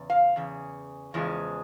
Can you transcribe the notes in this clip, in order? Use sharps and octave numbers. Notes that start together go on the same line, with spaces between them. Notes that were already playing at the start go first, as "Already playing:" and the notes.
Already playing: E2 C#3
F5
E2 C#3
E2 C#3 F3 G#3